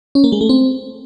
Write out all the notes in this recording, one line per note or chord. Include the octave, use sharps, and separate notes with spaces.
C#4
A#3
G#3
A3
C4